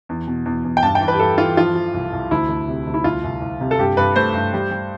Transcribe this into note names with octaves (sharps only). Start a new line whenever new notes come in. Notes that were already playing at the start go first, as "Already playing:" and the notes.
E2
B2
E2
E2
G5
G2 A5
G5
E3
B4
G4
G2 A4
E3 F4
F3 F4
F3
C2
C2
D2 E4
D2
C3
D2
E4
C2 F4
C2
C2
C3
A4
G2 G4
G2 B4
A3 C5
G2
G3
G3